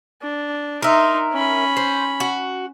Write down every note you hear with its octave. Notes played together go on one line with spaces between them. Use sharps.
D4
D#4 A#4 E5 C6
C#4 B5
C5
F#4